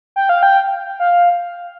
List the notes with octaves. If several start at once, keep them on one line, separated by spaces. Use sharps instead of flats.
G5
F5
G5
F5